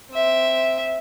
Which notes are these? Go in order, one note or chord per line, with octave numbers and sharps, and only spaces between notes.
C4 E5